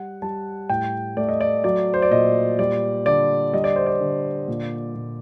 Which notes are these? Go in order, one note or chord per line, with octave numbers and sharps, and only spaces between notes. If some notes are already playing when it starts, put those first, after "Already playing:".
Already playing: G3 F#5
G3 A5
A2 G5
A3 D5
D#5
D5
F#3 D5
C5
D5
A#2 D#5
G3 D5
D3 D5
G3 D#5
D5
C5
D5
D3
A#2
A#2